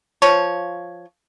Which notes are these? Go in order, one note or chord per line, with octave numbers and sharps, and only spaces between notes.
F3 F4 C#5